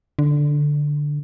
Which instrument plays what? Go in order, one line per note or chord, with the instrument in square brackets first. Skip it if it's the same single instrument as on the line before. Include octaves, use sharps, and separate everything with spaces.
[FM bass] D3